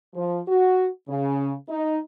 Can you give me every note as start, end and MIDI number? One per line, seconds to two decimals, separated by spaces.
0.14 0.40 53
0.48 0.86 66
1.09 1.53 49
1.68 1.98 63